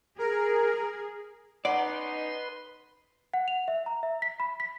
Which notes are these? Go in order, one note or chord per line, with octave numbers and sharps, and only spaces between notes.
G#4 A#4
B3 C#4 D#4 B4 D5 F#5 C6
F#5
F7
E5
A#5
E5
B6
B5
B6